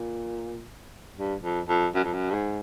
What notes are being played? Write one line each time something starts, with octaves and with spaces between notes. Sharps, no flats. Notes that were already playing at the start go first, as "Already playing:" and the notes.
Already playing: A#2
G2
F2
F2
F#2
F2
F#2
G2
G#2